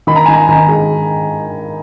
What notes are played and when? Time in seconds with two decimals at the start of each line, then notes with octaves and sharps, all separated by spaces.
0.07 D#3 B5
0.16 A#5
0.25 D#3 G#5
0.33 A#5
0.49 D#3
0.68 G#3